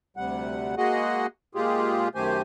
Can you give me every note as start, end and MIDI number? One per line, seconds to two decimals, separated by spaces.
0.17 0.75 38
0.17 0.75 48
0.17 0.75 55
0.17 0.75 78
0.78 1.27 56
0.78 1.27 58
0.78 1.27 66
0.78 1.27 68
0.78 1.27 75
0.78 1.27 78
1.55 2.08 46
1.55 2.08 56
1.55 2.08 65
1.55 2.08 67
1.55 2.08 68
2.15 2.42 42
2.15 2.42 51
2.15 2.42 57
2.15 2.42 67
2.15 2.42 72
2.15 2.42 80